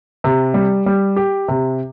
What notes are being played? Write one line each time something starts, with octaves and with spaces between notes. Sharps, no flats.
C3
G3
G3
G4
C3